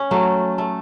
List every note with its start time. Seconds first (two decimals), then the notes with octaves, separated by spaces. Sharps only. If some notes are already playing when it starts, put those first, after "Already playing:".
Already playing: C#4
0.11 F#3 A3
0.58 A3